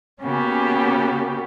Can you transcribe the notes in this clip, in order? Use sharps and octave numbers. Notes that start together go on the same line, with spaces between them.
C#3 A#3 B3 C#4 F#4 G4